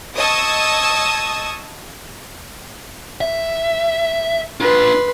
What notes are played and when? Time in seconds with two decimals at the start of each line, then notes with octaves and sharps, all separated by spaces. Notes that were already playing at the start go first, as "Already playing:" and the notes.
0.16 D#5 A5 C#6 D#6 E6 G#6
3.21 E5
4.60 D4 F4 B4 C6